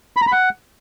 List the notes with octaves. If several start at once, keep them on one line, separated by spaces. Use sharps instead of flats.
B5
A#5
B5
F#5